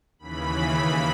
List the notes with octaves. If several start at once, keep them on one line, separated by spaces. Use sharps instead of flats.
D#2 C#3 E3 B5